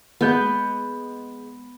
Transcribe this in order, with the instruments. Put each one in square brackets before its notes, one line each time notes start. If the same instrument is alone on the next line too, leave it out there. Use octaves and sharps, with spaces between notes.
[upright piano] G#3 G6 [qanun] B3